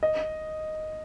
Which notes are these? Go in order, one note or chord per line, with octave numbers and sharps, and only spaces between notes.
D#5